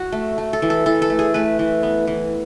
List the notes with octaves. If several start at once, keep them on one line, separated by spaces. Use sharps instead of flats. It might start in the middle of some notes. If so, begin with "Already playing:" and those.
Already playing: F#4
A3
A3
A4
E3
A4
E3 A4
A4
A3
G#4
A3 B4
E3
B3
E3